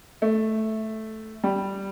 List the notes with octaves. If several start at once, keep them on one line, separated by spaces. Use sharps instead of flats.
A3
G3